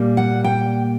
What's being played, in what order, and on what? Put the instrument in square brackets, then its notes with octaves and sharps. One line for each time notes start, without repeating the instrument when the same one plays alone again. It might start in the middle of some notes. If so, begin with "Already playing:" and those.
Already playing: [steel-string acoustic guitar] A#2 G3 A#3
F#5
G5